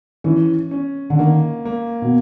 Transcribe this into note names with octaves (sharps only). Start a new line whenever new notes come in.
E3 C#4
C#4
D3
D#3 A#3
A#3
B2